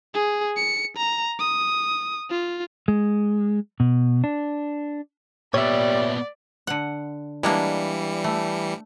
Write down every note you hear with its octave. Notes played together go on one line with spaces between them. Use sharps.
G#4
C#7
A#5
D#6
F4
G#3
B2
D4
A#2 G3 B3 C#5 D5 E5
D3 F#5
E3 G3 G#3 A#3 D4 C#7
A3